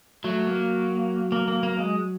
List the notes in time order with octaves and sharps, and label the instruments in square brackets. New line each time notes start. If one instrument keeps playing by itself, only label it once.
[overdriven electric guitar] F#3 [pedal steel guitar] A3
[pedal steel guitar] A#3
A#3
A#3
A#3
G#3